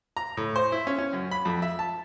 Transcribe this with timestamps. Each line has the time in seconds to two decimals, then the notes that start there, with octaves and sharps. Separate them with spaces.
0.17 A#5
0.37 A2
0.56 C5
0.72 E4
0.87 C#4
0.99 C#4
1.13 F#2
1.31 B5
1.45 F2
1.62 E5
1.79 A5